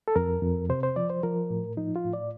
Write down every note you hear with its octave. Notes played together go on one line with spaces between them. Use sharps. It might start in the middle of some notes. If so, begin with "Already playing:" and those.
A4
F2 A#4
F2
C3 C5
C5
F3 D5
C5
F3 A#4
A2
F3 D#4
F4
A2
D5